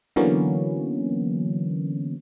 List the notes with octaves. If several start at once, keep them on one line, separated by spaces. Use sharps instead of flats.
D3 E3 F#3 A#3 B3 C#4